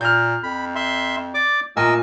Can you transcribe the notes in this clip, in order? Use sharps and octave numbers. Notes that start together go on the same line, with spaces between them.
A#2 F6 G6
F2 B5
E5 C6
D5 D6
A#2 A3 A#4 D#5 G#5 E6